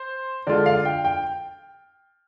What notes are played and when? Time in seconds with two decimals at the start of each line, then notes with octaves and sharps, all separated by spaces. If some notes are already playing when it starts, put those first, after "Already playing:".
Already playing: C5
0.47 D3 G#3 D4 F4 D5
0.66 F5
0.85 G5
1.05 G5